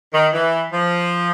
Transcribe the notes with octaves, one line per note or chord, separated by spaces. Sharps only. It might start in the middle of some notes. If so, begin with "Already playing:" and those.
D#3
E3
F3